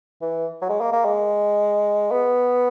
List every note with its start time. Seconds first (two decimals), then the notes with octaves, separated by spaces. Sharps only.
0.22 E3
0.61 F#3
0.69 G#3
0.81 A#3
0.93 A#3
1.05 G#3
2.11 B3